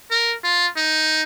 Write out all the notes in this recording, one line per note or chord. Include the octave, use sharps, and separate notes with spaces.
A#4
F4
D#4